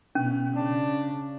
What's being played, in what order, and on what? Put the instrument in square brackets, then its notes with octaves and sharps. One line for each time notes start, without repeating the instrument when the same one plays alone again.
[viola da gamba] B2 [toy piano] C#4
[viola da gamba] C#3 [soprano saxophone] D4